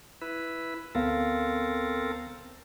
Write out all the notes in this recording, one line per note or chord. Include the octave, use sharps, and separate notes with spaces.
E4 B4
D2 B3 C4 A4 A#4 F5